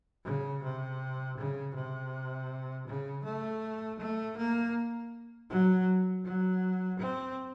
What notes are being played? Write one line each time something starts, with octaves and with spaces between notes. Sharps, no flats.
C#3
C3
C#3
C3
C#3
A3
A3
A#3
F#3
F#3
C4